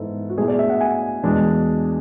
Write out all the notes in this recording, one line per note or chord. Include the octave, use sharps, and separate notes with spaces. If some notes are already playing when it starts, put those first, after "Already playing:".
Already playing: G#2 E3 B3 E4 A4
F#4
B2 A3 E4 G#4
D5
E5
F#5
G#5
E2 B2 G#3 D4